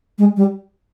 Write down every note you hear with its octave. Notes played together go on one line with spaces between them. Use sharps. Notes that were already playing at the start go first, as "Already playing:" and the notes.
G#3
G3